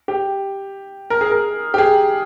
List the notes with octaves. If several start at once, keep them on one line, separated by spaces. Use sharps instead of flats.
G4
A#4
G#4
A#4
G4
G#4